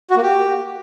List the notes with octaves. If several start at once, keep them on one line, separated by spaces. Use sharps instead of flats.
F#4
A#3
G4